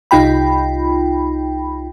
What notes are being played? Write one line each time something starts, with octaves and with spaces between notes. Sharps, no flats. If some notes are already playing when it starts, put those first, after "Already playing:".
C2 D#4 F4 G5 B5